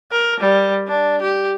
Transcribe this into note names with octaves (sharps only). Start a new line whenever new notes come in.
A#4
G3
D4
G4